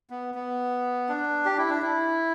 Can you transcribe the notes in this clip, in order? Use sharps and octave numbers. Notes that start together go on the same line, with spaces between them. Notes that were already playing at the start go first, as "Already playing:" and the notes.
B3
B3
D4
G4
E4
D4
E4